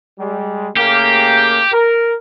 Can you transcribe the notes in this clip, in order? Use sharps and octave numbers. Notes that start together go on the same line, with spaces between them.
G3 G#3
C#3 A3 A#3 G4
A#4